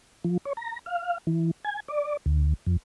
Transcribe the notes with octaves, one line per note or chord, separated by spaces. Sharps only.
F3
C#5
A#5
F5
E3
G#5
D5
D2
F2